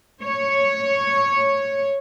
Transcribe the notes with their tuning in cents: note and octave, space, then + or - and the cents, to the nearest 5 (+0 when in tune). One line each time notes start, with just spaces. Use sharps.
C#5 -5